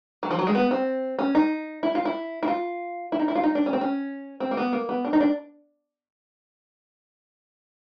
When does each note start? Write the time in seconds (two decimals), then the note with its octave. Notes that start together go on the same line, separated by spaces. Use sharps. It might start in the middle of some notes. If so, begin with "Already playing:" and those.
0.23 F#3
0.31 F3
0.39 F#3
0.47 G#3
0.55 B3
0.71 C4
1.19 C#4
1.35 D#4
1.83 E4
1.95 F4
2.05 E4
2.43 E4
2.48 F4
3.12 E4
3.19 D#4
3.28 E4
3.35 F4
3.44 D#4
3.55 D4
3.66 C#4
3.73 C4
3.81 C#4
4.40 C4
4.51 A#3
4.57 B3
4.73 A#3
4.89 B3
5.05 D4
5.13 D#4
5.21 D4